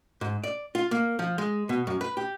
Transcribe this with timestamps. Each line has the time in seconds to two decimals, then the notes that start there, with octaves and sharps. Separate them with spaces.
0.21 G#2
0.44 D5
0.75 F4
0.91 A#3
1.19 F3
1.38 G#3
1.69 B2
1.87 F#2
2.01 B4
2.17 G4